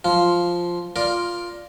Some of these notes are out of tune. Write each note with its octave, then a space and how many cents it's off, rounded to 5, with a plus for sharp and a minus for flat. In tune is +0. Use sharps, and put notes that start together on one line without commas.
F3 +0 F4 +0
F4 +0 A#4 +10 D5 +0